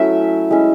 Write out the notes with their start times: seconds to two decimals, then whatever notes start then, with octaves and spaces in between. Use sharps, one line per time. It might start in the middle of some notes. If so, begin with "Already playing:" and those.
Already playing: F#3 A3 C#4 E4 E5
0.51 G#3 C#4 E4